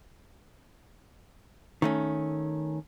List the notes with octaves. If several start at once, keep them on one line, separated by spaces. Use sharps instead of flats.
D#3 A3 C#4